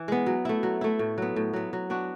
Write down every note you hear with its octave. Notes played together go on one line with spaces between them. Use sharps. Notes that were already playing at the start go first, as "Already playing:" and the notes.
Already playing: E3
G#3 B3
F#3
A3 E4
F#3
A3 E4
A2
F#3 B3
A2
F#3 B3
F#3
B3 D4 F#4